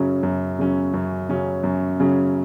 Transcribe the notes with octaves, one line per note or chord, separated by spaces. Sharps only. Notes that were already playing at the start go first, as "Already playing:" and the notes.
Already playing: F#2 C#3 F#3 C#4
F#2
C#3 F#3 C#4
F#2
C#3 F#3 C#4
F#2
C#3 F#3 C#4